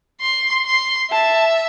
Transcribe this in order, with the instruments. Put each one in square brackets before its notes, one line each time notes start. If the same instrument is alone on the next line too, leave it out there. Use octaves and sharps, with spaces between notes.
[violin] C6
C6
[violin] E5 [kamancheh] A5